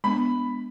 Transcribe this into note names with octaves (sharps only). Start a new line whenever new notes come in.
G#3 B3 D4 B5